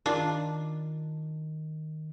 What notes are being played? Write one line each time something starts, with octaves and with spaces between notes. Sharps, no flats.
D#3 D4 F4